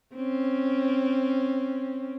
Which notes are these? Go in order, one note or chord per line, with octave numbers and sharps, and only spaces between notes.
C4 C#4